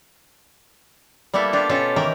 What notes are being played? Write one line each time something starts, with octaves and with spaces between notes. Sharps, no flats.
G3 A#3 B3 E4 A4
D4 F4 G4
B2 C#4 F4 G4 A4
D#3 E3 A#3 A#4 G5